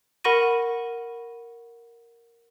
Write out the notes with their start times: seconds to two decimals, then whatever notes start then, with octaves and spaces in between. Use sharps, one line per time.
0.24 A#4 F#5 B5 C#6 A#6 D#7